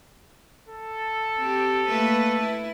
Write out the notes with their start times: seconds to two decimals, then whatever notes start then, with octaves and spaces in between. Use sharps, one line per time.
0.68 A4
1.37 C4 G4
1.87 A3 A#3 B4
2.40 E4